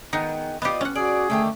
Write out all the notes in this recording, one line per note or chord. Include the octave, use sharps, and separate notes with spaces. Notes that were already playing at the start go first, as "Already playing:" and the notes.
D#3 G#3 B3 D#4
B3 F4 G4 D5 D#5
C#4 F#5
F#4 G#4 D5
D3 D#3 A3 G4